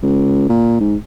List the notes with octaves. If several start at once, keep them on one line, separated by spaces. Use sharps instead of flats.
C#2
A#2
G#2